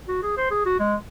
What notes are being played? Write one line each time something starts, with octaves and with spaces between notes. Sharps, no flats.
F#4
G#4
C5
G#4
F#4
G#3